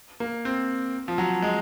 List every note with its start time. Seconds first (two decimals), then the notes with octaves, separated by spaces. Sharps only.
0.20 A#3
0.45 C4
1.08 F3
1.18 F#3
1.42 G#3